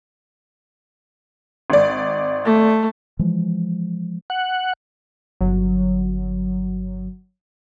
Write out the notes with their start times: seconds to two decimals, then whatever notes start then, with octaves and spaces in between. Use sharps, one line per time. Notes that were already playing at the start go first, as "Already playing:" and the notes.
1.70 G#1 D5
2.45 A3
3.19 E3 F3 G#3
4.30 F#5
5.40 G1 F#3